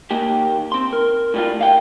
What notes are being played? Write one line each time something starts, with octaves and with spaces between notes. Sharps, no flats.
D#2 A#3 G4
C4 C6
A#4
A2 G3 F4
D#2 F5 G5